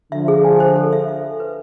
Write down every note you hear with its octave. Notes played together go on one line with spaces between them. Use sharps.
D3 F3 E5
G#4
G#5
C5
A4
E5
E5
A4
B4